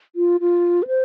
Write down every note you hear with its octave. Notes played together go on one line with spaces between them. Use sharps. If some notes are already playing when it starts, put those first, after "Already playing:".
F4
F4
B4
C5